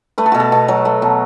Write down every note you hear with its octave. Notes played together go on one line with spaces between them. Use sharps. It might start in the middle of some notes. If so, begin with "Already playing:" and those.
A3 B4
A4
B2 F#4
A4
B2
F#3
A3
B2